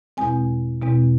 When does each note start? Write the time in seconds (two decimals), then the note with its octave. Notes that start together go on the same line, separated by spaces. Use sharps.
0.17 E2 B2 G#3 C4 G#5
0.82 E2 B2 G#3 C4